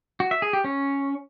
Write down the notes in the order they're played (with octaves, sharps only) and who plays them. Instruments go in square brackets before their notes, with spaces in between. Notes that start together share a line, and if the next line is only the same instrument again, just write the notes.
[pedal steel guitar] F#4
E5
G#4
G4
C#4